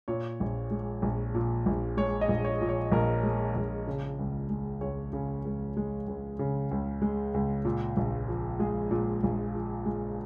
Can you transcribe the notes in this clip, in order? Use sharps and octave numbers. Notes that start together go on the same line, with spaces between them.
A#2 C#5
A#1
G#3
A#1
A#2
A#1
G#3 C#5
D#5
A#1
C#5
A#2
C#5
A#1 A#4
G#3
A#1
C#3
C#2
G#3
C#2 C#5
C#3
C#2
G#3
C#2
C#3
C#2
G#3
C#2
A#2
A#1
F3
G#3 G#4
A#2
A#1
F3
G#3